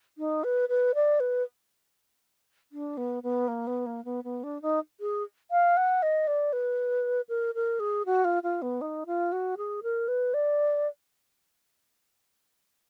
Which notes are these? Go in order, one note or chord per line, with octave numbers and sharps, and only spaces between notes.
D#4
B4
B4
D5
B4
D4
B3
B3
A#3
B3
A#3
B3
B3
D4
D#4
G#4
F5
F#5
D#5
D5
B4
A#4
A#4
G#4
F#4
F4
F4
B3
D#4
F4
F#4
G#4
A#4
B4
D5